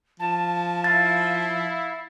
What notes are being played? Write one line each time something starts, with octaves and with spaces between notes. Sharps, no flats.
F3 A5
E4 F5 A6